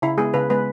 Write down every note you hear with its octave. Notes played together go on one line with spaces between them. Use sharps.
C#3 E4
G#3 B3 G#4
C#3 B4
G#3 B3 B4